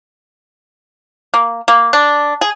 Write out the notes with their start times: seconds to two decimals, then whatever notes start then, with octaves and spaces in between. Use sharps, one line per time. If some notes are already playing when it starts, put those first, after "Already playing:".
1.34 A#3
1.68 A#3
1.93 D4
2.41 G#4